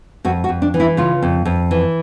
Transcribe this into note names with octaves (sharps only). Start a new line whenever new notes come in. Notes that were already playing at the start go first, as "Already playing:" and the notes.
F2 F#4
F#4
F2
D4
E3
E4
C#3 F4
F2
F2
E3